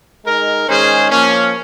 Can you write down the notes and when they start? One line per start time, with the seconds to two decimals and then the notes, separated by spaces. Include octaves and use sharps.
0.24 G#3 D#4 A#4
0.67 D#3 G#3 C#4 G#4 C5
1.10 F3 A#3 C#4